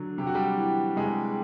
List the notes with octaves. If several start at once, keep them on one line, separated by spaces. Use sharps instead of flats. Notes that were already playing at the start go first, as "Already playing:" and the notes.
Already playing: D3 F#3
C3 G4
F#4
G3 G4
E3
C3 G#3 G#4